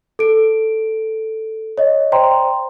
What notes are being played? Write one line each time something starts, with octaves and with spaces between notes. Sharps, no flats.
A4 D7
C#5 D#5
C5 D5 G5 A#5 C6